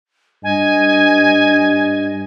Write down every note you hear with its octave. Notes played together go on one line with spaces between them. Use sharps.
G2 D#5 G#5